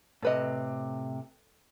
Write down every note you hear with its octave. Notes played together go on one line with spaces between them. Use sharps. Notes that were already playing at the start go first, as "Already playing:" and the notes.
A2 C3 A4 B4 D#5